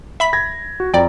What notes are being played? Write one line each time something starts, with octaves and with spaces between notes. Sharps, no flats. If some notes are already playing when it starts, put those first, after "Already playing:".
E5 B5 B6
G#6 A#6
F#4
F2 D5 G5 A#5